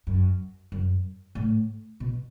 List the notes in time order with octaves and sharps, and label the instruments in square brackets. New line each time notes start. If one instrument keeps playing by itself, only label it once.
[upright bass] F#2
F#2
A2
B2